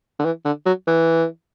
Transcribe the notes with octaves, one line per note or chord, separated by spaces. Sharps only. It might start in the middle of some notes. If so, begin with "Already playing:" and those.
D3
E3
D3
F#3
E3